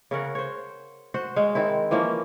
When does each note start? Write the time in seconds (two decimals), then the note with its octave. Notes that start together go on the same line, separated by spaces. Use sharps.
0.11 C#3 C#4 A#4 F#5
0.35 C5 C#5
1.14 F#4 C5 F#5
1.36 G#3 C#5 F5
1.55 D#3 C4 E4
1.91 E3 F3 A#3 C#4